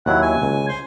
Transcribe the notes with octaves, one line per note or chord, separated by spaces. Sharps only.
D#2 F#3 E4 F#5
G#5
C#2
C5